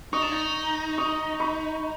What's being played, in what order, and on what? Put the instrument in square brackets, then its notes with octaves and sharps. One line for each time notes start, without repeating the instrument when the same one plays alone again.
[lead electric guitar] D#4 [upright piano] C#6 D#6
[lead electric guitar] D4
D#4
[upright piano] C#6 D#6
B5 C#6